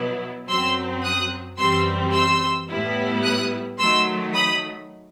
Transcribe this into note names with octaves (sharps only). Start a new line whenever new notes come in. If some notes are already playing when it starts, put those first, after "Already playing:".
Already playing: B2 F#3 B3 E4
F#2 F#3 C4 C6 E6
D#6 F#6
F#2 E3 G3 C4 C6 E6
C6 E6
A2 G3 B3 E4
D#6 F#6
D#3 F#3 A3 C6 E6
B5 D#6